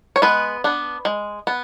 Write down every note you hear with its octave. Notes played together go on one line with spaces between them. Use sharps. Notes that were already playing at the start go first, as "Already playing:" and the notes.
C#5
G#3 B3 B4
B3 D4
G#3
B3